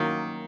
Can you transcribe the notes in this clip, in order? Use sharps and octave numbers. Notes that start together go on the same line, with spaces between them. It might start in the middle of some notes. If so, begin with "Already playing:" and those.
Already playing: D#3 F#3 A#3 C#4